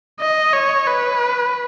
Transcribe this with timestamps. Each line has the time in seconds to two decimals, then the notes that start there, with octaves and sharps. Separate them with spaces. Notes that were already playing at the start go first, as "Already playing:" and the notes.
0.20 D#5
0.53 C#5
0.87 B4